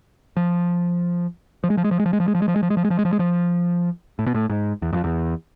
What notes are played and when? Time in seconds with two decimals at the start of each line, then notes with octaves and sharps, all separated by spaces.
0.37 F3
1.64 F3
1.70 G#3
1.77 F3
1.84 G#3
1.91 F3
2.00 G#3
2.06 F3
2.13 G#3
2.20 F3
2.28 G#3
2.35 F3
2.42 G#3
2.48 F3
2.56 G#3
2.63 F3
2.70 G#3
2.77 F3
2.84 G#3
2.90 F3
2.99 G#3
3.05 F3
3.13 G#3
3.19 F3
4.19 A2
4.27 B2
4.35 A2
4.50 G#2
4.82 E2
4.93 F2
5.04 E2